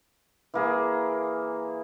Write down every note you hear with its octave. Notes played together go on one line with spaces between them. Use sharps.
E3 A#3 G#4